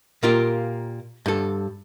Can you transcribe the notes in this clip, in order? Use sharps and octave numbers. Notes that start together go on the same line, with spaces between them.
A#2 A#3 F4 G4
G2 A4